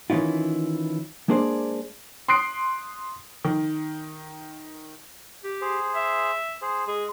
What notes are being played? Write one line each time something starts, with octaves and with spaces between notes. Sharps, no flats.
D#3 E3 C#4 E4 F4
G#3 A#3 D4 G#4 C5 D5
C6 D#6 F#6 C7 D7
D#3
G4
G#4 C5
E5
G#4 C5
G#3 G#4